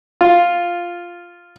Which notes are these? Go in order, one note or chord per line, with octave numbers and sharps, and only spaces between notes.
F4